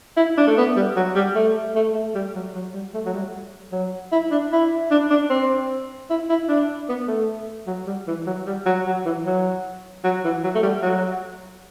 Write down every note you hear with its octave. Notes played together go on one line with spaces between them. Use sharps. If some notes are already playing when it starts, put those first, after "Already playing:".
E4
D4
A3
B3
G3
F#3
G3
A3
A3
A3
G3
F#3
F#3
G3
A3
F#3
G3
F#3
E4
D4
E4
D4
D4
C4
E4
E4
D4
B3
A3
F#3
G3
E3
F#3
G3
F#3
F#3
E3
F#3
F#3
E3
F#3
A3
G3
F#3